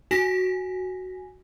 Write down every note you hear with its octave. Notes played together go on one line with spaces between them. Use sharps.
F#4 G#5 A#6 B6